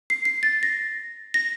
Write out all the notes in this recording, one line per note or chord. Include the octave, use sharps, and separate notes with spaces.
C7
C7
A6
A#6
A#6